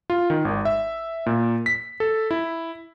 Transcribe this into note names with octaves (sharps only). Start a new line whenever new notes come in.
F4
D#3
G#1
E5
A#2
B6
A4
E4